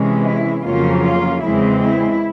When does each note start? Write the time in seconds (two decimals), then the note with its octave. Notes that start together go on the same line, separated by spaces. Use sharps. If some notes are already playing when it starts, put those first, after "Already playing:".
Already playing: C3 E3 G#3 C#4
0.25 E4
0.63 F2 C#3 F#3 A#3 C#4 F4
1.02 F4
1.42 E2 C#3 E3 G#3 C4 E4
1.81 E4